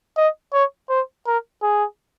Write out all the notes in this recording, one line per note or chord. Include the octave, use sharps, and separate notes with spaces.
D#5
C#5
C5
A#4
G#4